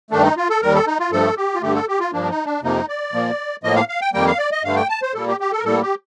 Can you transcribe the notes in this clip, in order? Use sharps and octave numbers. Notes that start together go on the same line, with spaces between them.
G2 D#3 A3 D4
D#4
F4
A4
D#2 D#3 G3 A#4
A4
D#4
F4
G2 F3 A3 A4
G4
F4
G2 D3 A3 G4
A4
G4
F4
G2 F3 A#3 D4
D#4
D4
F2 C3 F3 A#3 D#4
D5
A#2 F3 A#3
A2 F3 A#3 D#5
F5
F5
G5
F2 D#3 G3 A#3 G5
F5
D5
D#5
G2 D3 A3 F5
G5
A5
C5
A#2 G3 A#3 A4
G4
G4
A4
A#4
A2 G3 A#3 A4
G4